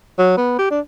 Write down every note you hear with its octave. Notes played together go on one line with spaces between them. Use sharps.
F#3
B3
G4
D4